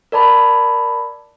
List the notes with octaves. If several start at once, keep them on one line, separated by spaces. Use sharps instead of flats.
A#4 D5 A5 B5